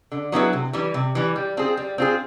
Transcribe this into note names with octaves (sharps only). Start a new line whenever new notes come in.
D3
F#3 B3 E4 G#4
C3
E3 G3
C3
E3 G3
G3
C4 F4 G#4
G3
C4 F4 G#4